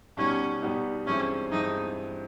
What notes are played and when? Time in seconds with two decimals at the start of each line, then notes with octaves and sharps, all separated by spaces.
0.17 B2 G3 B3 C#4 D#4
0.62 B2 G3 B3 D#4
1.06 G2 E3 G#3 C4 C#4
1.51 G2 E3 G#3 C4 D#4